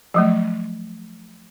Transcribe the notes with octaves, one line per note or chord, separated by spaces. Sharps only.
F3 F#3 A3